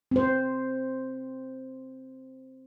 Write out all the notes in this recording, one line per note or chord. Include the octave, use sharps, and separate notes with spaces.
C4 C5